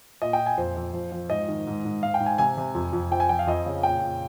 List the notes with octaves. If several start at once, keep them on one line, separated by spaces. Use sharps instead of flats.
A#2 D#5
G5
A#2
G#5
F2 C5
F2
F3
F3
G#2 D#5
D#3
G#2
G#2
G#2 F5
G5
G#2
G#5
C3 G#5
C3
F2
F2
F3 G5
G#5
F3 G5
F5
F2 D#5
C#3
A#2 G5
A#2